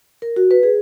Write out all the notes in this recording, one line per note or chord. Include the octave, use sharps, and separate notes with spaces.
A#4
F#4
B4
G#4